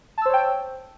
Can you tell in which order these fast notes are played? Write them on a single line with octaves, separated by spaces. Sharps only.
A5 E6 C5 C#5 G5